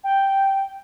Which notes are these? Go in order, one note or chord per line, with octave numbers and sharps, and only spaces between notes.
G5